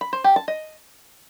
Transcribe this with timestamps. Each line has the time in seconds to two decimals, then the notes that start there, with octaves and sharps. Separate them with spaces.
0.01 B5
0.13 C5
0.24 G4
0.36 A5
0.48 D#5